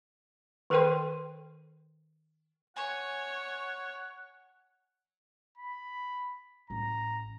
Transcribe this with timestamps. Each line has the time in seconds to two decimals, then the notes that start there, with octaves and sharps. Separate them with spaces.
0.70 D#3 A4 A#4 C5 G5 C6
2.76 C#5 F#5 G#5 C#6
5.58 B5
6.70 A1 A#5